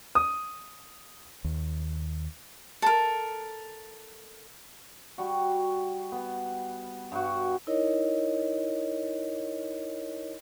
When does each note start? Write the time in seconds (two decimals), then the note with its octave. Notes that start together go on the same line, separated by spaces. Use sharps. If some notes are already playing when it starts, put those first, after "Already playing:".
0.15 D#6
1.44 D#2
2.82 A4 A#4
5.18 G3 F#4
6.12 B3
7.12 G2 F#4
7.67 D#4 E4 A#4 C#5 D#5